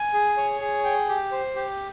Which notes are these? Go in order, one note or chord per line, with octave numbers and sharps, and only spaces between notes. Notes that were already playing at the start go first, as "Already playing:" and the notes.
Already playing: G#5
G#4
C#5
G#4
G5
G4
C5
G4